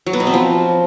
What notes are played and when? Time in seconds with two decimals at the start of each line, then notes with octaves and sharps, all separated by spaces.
0.07 F#3
0.13 B3
0.20 B2
0.27 C4
0.34 F3